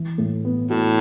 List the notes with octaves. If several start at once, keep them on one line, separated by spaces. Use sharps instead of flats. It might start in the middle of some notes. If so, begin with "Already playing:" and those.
Already playing: E3
A2
B3
A2 F#4